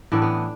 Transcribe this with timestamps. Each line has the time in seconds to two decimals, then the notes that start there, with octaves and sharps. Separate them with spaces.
0.12 A2 E3 B3 D4
0.22 B3